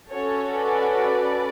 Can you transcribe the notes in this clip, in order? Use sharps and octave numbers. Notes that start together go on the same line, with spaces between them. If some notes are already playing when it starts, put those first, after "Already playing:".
C#4 F#4 A4 C#5
B4 D5